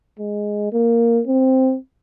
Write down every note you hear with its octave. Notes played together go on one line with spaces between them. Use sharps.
G#3
A#3
C4